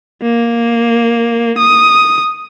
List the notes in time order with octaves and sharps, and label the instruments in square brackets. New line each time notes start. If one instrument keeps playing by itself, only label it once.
[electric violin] A#3
D#6